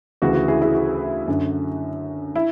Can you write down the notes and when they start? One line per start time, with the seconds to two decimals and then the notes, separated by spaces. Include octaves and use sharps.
0.22 D2 C#3 E3 F#4
0.35 F#4
0.48 E4 G#4
0.62 E4 G#4
0.75 F#4
1.28 F#2 D3
2.36 E4